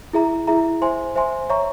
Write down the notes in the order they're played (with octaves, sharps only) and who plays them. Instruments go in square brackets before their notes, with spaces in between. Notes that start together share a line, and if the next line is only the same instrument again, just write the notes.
[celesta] E4 G#4 E5 A#5
E4 G#4 E5 A#5
C5 E5 G#5 C6
C5 E5 G#5 C6
C#5 E5 A#5 C#6